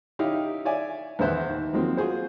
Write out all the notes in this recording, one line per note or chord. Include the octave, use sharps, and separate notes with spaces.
C#4 D#4 E4 G4 F5
C#5 D5 E5 G#5
E2 E3 B3 C5 E5 F#6
D#2
F3 F#3 G#3 A#3 C4
F4 F#4 G#4 C5